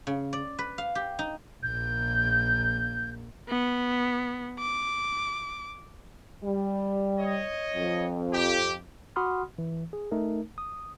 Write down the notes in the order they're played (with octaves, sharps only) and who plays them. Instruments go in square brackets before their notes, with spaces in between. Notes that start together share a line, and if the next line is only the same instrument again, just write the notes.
[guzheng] C#3
D5
B4
F5
G4
D#4
[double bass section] A#1 A#3 [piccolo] G6
[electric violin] B3
D6
[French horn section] G3
[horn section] C#5 D#5
[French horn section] F2
[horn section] G4
[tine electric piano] F#4 F#5 B5 C6 D#6 F6
E3
G#4
A3 D#4 A#4
D#6